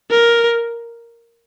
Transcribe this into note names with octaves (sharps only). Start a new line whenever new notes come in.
A#4